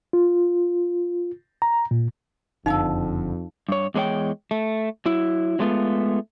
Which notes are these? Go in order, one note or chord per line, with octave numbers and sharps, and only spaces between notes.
F4
A#5
A#2
F#1 F2 D3 D#4 F5 A5 E6
G2 C#5
E2 G#3 D4 C#5 G5
A3
F#3 E4
F#3 G#3 A3 B3 F4